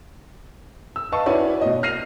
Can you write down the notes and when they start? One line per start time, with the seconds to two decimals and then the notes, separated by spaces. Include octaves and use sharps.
0.96 E6
1.12 B4 D#5 F5 A5 C#6
1.26 C#4 E4 F#4 B4 C#5 D5
1.61 B2 D#5
1.83 F6 A#6 C7 D#7 F7